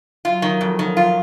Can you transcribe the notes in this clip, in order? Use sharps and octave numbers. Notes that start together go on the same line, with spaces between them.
F#3 F4
D#3
F2 F3
D#3
F4